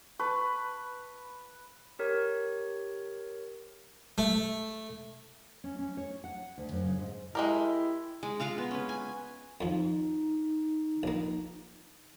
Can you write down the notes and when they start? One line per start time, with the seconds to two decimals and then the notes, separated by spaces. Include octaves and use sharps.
0.19 B4 A5 C#6
1.99 G4 A#4 C#5
4.18 A3
5.64 C#4
5.79 C#4
5.97 C#5
6.24 F#5
6.58 D2
6.72 F#2
6.84 C#3
6.99 G#2
7.35 G#3 E4 G4 A#4
8.23 G#3
8.40 G#3 F4 F5 A#5
8.58 B3
8.71 C#4 B4
8.89 G#5
9.61 F2 F3 D#4
11.03 A#1 A#3